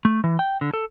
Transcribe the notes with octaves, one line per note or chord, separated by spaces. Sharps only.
A3
E3
G5
D3
A4